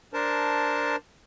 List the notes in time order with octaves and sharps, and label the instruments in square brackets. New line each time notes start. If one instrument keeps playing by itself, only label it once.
[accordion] D4 A#4 C5 A5